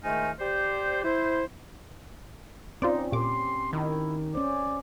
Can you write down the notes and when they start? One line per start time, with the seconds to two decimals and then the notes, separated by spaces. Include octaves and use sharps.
0.03 G#2 D#3 A3 D#4 F4 G#5
0.39 G4 C5 D5
1.04 E4 C5
2.82 C4 C#4 D#4 F4 C5 D5
3.12 A#2 G4 C6 D6
3.73 D#3 E4
4.35 C#4 C5 D5